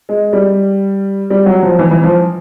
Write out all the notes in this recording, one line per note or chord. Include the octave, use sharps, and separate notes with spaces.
G#3
G3
G3
F#3
F3
E3
E3
F3